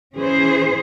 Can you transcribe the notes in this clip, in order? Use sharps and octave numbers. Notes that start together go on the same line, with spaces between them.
E3 C#4 G#4 C5